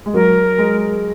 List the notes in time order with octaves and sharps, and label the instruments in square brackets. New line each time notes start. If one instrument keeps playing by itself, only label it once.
[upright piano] G#3
[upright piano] F#3 [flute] A#4
[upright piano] G#3